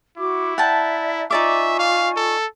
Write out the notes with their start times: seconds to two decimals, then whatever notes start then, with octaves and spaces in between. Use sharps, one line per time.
0.18 E4 F#4 D6
0.58 D5 E5 F#5 G5 A5 A#5
1.30 D#4 F4 D5 E5 G#5 C#6 D6
1.79 F5
2.17 A4